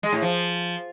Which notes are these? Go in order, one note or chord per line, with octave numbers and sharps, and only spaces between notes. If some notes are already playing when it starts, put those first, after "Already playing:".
G#3
A2
F3